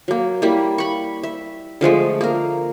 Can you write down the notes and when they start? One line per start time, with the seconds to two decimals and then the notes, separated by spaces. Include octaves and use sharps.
0.08 F#3 A#3
0.42 G3 A#3 E4
0.78 B5 C#6
1.23 E5
1.81 D3 F3 G#3 A3
2.21 A#3 A#4